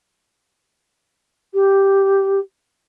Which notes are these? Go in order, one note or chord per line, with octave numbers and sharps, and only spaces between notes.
G4